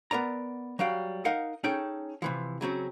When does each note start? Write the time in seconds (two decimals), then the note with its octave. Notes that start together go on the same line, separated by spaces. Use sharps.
0.11 B3 A#4 D5 A#5
0.79 F#3 G3 F5 G5
1.25 D#4 A#4 D#5 F5 F#5
1.64 C#4 D#4 G#4 A4 C#5 G5
2.22 C3 E3 F3
2.61 C#3 F#3 C4 C#4